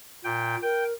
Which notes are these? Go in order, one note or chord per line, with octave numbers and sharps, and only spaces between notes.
A#2 G5
A#4 G5